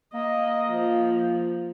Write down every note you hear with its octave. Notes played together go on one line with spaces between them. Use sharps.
A#3 D#5
F3